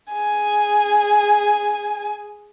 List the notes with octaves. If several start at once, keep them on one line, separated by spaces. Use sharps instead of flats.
G#4 G#5